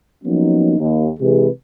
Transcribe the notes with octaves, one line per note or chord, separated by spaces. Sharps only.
F3 F#3 A#3 B3 C#4 D#4
D#2
C3 E3 G#3 G4 G#4 B4